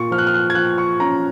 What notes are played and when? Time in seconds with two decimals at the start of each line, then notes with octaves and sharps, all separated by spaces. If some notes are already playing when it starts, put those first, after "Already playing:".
Already playing: A#2 C#6
0.11 F3 F6
0.18 F#6
0.27 F6
0.34 F#6
0.50 G#6
0.55 F3 F#6
0.78 C#6
1.00 C#4 A#5